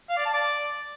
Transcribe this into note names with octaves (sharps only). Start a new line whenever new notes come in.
F5
D5
A5
D5